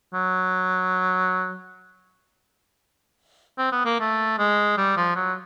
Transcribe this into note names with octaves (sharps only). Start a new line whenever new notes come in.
F#3
C4
B3
A#3
A3
G#3
G3
F3
F#3